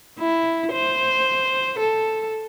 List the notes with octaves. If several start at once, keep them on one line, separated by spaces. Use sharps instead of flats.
E4
C5
A4